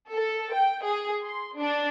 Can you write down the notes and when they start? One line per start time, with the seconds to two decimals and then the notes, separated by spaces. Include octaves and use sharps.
0.11 A4
0.53 G5
0.85 G#4
1.23 C6
1.57 D4